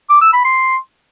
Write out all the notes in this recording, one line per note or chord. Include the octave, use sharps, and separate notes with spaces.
D6
E6
B5
C6